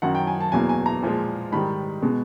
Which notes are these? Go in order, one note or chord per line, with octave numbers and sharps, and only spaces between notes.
F#2 D#3 F#3 F#5
G5
G#5
A5
E2 B2 F#3 A#3 G#5
G#5
A#5
A#2 F3 G#3
G#2 D#3 G3 B5
B2 G#3